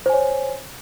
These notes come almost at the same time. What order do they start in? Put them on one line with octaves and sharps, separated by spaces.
C5 G#5 C#5